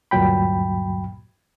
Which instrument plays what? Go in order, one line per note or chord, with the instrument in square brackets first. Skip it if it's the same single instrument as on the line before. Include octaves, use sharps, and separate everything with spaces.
[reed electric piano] D2 G2 A#2 F#3 G5 B5